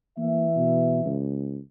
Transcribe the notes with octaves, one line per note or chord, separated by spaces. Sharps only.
E3 A#3 E5
B2
C#2